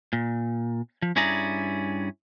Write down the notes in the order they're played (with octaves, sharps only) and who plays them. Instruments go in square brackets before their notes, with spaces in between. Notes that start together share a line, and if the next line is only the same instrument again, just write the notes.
[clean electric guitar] A#2
F3
G2 C#4 E4 G#4 D5 A#5